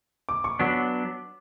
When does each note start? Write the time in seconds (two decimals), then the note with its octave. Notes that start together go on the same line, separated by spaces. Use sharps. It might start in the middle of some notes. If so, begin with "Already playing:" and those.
0.29 D6
0.44 C#6
0.59 F#3 B3 D4 C#6